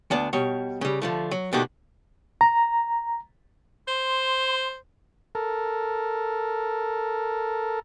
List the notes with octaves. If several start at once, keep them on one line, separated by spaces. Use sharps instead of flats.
D2 B3 D4 D5
B2 G3 C#5
C#3 G3
D3 F3 A3
F#3
B2 D#3 A3 D4 F#4 G4
A#5
C5 C6
A4 A#4